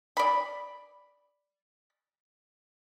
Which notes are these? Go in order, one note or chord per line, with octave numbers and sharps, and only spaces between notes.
D5 B5